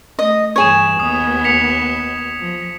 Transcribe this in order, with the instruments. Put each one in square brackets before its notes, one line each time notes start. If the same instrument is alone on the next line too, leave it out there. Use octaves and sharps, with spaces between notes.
[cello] A3 [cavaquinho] D#5
[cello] G2 E3 [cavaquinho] G#4 C#5 [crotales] G#6 E7
[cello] D#2 B3 [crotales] D#6
[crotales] B6 C#7 F7
[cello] F3